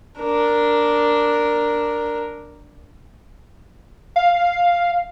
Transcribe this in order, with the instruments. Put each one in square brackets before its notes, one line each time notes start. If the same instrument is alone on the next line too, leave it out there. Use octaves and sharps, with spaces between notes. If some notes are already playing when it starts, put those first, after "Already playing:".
[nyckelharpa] D4 A#4
[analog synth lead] F5